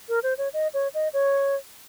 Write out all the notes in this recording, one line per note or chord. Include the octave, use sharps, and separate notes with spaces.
A#4
C5
C#5
D#5
C#5
D#5
C#5